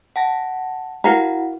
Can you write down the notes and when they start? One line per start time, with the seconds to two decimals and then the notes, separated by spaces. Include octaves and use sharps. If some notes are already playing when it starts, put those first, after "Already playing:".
0.16 F#5 A5 A#6
1.04 E4 F#4 A#4 F5 F#5 A#5